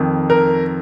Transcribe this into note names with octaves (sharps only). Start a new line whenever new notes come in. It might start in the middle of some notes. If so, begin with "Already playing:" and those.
Already playing: F2 D#3
A#4